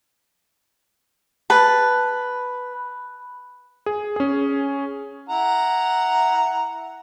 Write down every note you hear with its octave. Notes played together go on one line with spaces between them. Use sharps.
B4 A5
G#4
C#4 G#4
E4 F#5 A#5